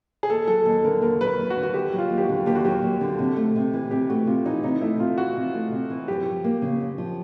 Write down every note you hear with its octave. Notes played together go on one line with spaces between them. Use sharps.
G#4
D#2 A4
F#3 A4
D#2 A4
D3 A#4
D#2 A#4
F#3 B4
A#4
D#2
F#4
D3
F#4
D#2 G4
F#3
F4
D#2
G4
F#4
D3
D#2 G4
F#4
F#3 G4
D#2
D3
C3
A3
C3
E3
C3 G4
A3 F#4
C3 F4
E3 D#4
C3 D#4
A3 E4
C3 F4
E3 F#4
C3
A3
C3
E3
F#2 G4
F3
A#3
C#3
F#2
F3